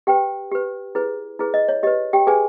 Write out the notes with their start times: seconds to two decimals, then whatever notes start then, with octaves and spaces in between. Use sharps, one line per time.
0.07 G4 B4 G5
0.52 G4 B4
0.95 E4 G#4 B4
1.39 E4 G#4 B4
1.54 D#5
1.68 C#5
1.83 G4 B4 D#5
2.13 G4 G5
2.27 G4 G#4 B4 G#5